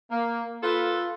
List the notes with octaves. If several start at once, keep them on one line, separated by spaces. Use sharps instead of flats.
A#3
F4 A4 B4